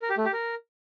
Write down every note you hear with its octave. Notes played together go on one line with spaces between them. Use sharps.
A#4
G4
A3
G4
A#4